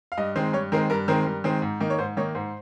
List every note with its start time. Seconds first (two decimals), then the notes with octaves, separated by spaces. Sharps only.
0.12 F5
0.17 G2 D#5
0.36 D#3 G#3 C4
0.53 G2 C#5
0.72 D#3 G#3 C4 A#4
0.90 G2 A#4
1.08 D#3 G#3 C4 A#4
1.26 G2
1.44 D#3 G#3 C4
1.62 G#2
1.80 D#3 A#3 D#4
1.90 C#5
1.98 G#2 C5
2.17 D#3 A#3 D#4 C#5
2.35 G#2 C5